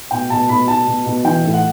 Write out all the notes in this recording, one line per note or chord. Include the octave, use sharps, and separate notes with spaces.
B2 G5
B2 A5
B2 B5
B2 A5
B2
B2
E3 G5
A2
F#5